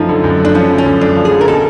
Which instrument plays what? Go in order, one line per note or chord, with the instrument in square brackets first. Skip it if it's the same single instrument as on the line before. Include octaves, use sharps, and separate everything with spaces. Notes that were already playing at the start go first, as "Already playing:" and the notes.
Already playing: [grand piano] F#2 F3 A3 [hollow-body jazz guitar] D#4
[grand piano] D3
F#2
[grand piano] A3 [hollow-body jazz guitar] D4
[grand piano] F3 [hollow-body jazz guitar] C#4
[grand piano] D3
[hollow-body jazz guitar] C#4
[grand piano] F#2
[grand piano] A3 [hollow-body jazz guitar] D4
[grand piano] F3
[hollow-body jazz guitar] G#4
[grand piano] D3
[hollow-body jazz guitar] A#4
[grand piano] B2 [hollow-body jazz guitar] A4